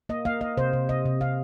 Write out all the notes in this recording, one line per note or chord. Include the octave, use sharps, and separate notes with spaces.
A#3 D#5
A#3 F5
A#3 D#5
C3 C5
C3
C3 D#5
C3
C3 F5